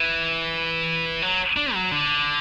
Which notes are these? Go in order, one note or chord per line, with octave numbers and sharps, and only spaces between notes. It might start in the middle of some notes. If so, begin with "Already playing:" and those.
Already playing: E3
F#3
D4
F#3
D3